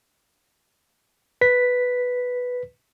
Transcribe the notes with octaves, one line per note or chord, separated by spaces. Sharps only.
B4 B6